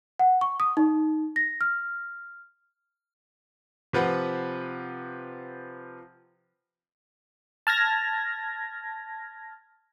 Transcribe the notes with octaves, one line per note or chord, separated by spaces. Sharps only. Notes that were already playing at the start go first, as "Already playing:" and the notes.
F#5
C#6
D#6
D#4
A#6
F6
C3 F3 B4 F#5
A5 F6 G#6 A#6